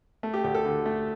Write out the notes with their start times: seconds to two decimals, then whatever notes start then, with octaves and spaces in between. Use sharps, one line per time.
0.23 A3
0.34 G4
0.44 D2 G4
0.55 A4
0.65 D3
0.86 A3